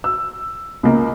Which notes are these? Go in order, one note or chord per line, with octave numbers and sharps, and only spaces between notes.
E6
C#2 A#3